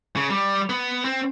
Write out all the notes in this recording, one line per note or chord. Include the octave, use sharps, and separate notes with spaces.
C#3
G3
B3
C4